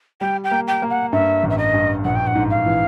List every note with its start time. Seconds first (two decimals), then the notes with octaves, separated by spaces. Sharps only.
0.21 G3 G5
0.44 G5
0.51 A#3
0.68 G5
0.82 A#3
0.90 F#5
1.13 G2 E5
1.43 A1
1.50 E5
1.58 D#5
1.74 G2
2.04 A#1 F#5
2.16 G5
2.27 F#5
2.35 G#2
2.50 F5
2.66 E3